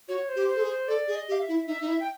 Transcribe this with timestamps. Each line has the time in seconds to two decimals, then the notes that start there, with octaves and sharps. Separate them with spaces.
0.08 F#4 C#5
0.29 C5
0.36 G4
0.48 C5
0.56 A4
0.62 G#4
0.68 C5
0.88 A4 D5
1.08 G#4
1.15 D#5
1.28 G4
1.32 F5
1.41 E5
1.48 E4
1.67 D#4 E5
1.81 D#4
1.88 E4
2.00 G5